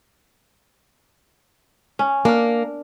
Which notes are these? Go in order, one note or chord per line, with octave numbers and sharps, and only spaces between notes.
C#4
A#3 D4 A#4